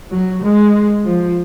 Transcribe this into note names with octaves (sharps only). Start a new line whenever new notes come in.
F#3
G#3
F3